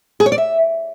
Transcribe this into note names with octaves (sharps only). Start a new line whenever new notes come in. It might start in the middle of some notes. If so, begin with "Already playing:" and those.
G#4
C#5
D5
E5